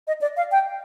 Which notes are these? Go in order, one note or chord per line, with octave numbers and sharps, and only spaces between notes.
D#5
D5
F5
G5